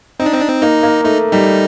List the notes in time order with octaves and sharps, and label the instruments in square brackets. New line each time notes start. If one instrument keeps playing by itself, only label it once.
[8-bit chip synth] C4 [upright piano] D#4
[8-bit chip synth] D4
C4
D4
C4
[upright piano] A#3 [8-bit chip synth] D#4
[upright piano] A#3
[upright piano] A3 [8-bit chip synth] D#4
[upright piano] G3 [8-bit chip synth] D#4